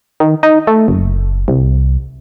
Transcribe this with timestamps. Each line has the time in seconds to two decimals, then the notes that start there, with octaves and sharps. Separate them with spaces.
0.20 D#3
0.43 D#4
0.67 A3
0.88 F#1
1.48 C2